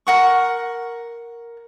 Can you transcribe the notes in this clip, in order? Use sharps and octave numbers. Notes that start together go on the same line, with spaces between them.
A#4 F#5 C#6